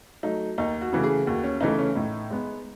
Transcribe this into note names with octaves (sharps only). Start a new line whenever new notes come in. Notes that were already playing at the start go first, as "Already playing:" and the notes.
F#3 A3 D#4
D#2 D#4
F#4
C#3 E3 A3
G#4
D#2 F#4
C#4
C#3 E3 A3 D#4
C#4
A2 D#4
G#3 B3